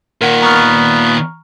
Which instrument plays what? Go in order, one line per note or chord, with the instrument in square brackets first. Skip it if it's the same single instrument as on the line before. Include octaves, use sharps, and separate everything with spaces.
[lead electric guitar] A#2 D#3 [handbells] A#4 F#5
[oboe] B3 [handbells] A#5 C#6 F6